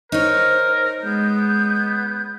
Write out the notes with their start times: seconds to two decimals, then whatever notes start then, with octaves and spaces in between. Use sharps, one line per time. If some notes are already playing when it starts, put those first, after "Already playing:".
0.12 D#4 A#4 C5 C#5
1.03 G#3 B3 G6